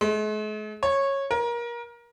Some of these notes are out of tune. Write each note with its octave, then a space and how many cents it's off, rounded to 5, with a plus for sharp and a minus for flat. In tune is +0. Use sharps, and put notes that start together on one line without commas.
G#3 +45
C#5 -15
A#4 +25